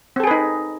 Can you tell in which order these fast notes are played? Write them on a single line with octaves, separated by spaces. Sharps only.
C4 A4 G#4 B4 D#4